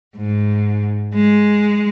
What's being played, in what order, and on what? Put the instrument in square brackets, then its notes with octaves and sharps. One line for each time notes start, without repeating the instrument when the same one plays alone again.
[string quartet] G#2
G#3